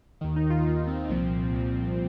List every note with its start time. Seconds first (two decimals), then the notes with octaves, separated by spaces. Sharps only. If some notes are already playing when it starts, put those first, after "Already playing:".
0.21 D#2 D#3
0.36 D#4
0.50 F4
0.64 D#2 D#3 F4
0.87 C4
1.09 C2 A#2 F3 C4
1.53 C2 A#2 F3